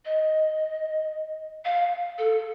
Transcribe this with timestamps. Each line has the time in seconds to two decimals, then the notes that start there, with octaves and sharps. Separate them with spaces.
0.05 D#5
1.65 F5
2.18 A4